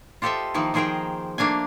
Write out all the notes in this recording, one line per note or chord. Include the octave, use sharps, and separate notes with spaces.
F4 G4 A4 C5 D#5 E5
D#3 F3 A#3 D#4 E4
D#3 F3 G#4 A#4 C5 G5
A3 A#3 D4 F5 G#5